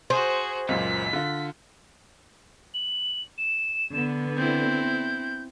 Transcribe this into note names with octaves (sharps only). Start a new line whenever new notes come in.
F#4 G#4 C5
C#2 F#2 A#2 B6
D3 F4
F#7
E7
D3 B3
C4 E4 G6